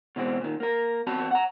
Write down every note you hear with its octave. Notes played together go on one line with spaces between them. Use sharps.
B2 E3 G#3 C4
A#2 D#3
A#3 A#4
E2 C4 F#4 A5 B5
F#5 A#5